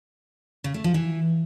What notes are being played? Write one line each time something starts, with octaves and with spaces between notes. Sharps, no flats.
C#3
A3
F3
E3